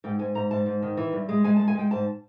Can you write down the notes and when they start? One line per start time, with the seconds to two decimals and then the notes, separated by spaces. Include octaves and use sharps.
0.04 G#2 G5
0.19 G#2 G#5
0.35 G#2 A#5
0.51 G#2 A5
0.66 G#2
0.82 D#3
0.97 E3
1.13 G2
1.29 G#3
1.44 G#3 G#5
1.56 A5
1.60 G#3
1.68 G#5
1.75 G#3 G5
1.91 G#2 A5